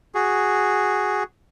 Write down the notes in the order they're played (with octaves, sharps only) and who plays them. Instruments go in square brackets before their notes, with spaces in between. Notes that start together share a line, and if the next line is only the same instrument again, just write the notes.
[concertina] F#4 G#4